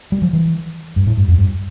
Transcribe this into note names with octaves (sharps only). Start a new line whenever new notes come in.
G3
F3
E3
G2
A2
G2
F2
G2